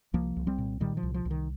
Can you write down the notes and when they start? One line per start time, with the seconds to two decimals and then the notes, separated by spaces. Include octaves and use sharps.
0.13 C2 F3 A#3
0.36 C2
0.47 G3 C4
0.58 A#2
0.80 A#2 D#3 G3
0.97 F3
1.03 C2
1.14 F3
1.25 C2
1.31 D#3